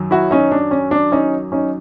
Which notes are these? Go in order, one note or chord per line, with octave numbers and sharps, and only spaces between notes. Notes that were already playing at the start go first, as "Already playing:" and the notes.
Already playing: F#2 D#3 F#3
E4 F#4
C#4 D#4
D4
C#4
D4
C#4 D#4
C#4 D#4